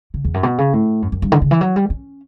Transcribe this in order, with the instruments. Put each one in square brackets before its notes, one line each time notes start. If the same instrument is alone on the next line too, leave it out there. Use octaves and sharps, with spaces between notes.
[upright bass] C#3
E2
F#2
B2
C#3
A2
F#2
F#2
G2
D3
C#3
E3
F#3
G3
C#4